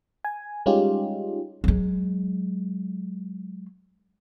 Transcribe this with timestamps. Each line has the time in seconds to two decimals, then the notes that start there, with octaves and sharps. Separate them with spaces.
0.25 G#5
0.66 G3 G#3 C#4 D#4 F4 G4
1.64 F#3 G#3